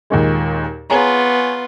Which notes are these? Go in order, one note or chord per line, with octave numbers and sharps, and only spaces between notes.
D#2 A#2 G#3
B3 F4 G#4 C#5 A#5